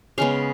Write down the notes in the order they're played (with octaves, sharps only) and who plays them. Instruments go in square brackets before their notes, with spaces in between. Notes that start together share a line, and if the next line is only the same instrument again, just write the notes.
[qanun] C#3 G#3 B3 F5